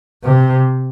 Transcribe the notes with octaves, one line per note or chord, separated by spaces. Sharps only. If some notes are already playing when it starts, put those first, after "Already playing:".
C3